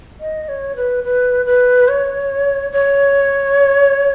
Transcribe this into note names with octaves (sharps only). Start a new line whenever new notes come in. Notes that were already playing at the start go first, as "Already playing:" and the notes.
D#5
C#5
B4
B4
B4
C#5
C#5